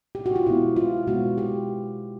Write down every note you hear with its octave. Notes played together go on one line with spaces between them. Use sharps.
G4
F#4
F4
B2 G#3 B3 E4
F4
B2 G#3 B3 F#4
G4